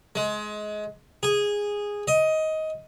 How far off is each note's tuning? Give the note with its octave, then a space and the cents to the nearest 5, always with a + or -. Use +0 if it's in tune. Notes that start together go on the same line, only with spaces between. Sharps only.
G#3 +25
G#4 -10
D#5 +15